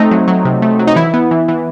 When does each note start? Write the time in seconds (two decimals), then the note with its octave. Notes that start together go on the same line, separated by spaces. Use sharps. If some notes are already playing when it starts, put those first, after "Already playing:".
Already playing: A3 C4 D#4
0.11 F#3
0.28 F#3
0.45 C3
0.62 A3
0.79 F#3
0.87 D#4
0.96 E3 E4
1.14 B3
1.31 E3
1.48 E3